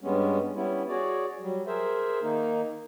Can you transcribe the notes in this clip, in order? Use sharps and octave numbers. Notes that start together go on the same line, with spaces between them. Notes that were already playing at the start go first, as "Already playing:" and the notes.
G2 G3 G#3 B3 C#4
G3 B3 C#4 E4
F#4 G#4 C#5 D5
F#3 G3
G#4 A#4 C5 E5
D#3 A#3 D#4